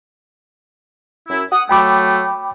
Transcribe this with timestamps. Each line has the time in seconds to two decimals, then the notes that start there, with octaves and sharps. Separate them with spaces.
1.29 F#2 E4
1.52 F#5 D#6
1.69 F#3 A3 G5 B5 D6